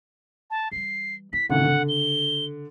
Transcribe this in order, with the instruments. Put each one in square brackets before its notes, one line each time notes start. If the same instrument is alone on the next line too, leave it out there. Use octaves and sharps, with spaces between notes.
[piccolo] A5
[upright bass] E3 G3 [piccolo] C7
[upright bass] E4 [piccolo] B6
[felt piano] G#1 F#2 A2 [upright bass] C#3 [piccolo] F#5
[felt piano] D3
[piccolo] G7